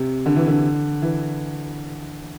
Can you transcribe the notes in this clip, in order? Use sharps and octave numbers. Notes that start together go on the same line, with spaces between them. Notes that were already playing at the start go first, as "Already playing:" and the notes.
Already playing: C3
D3
E3
D3
E3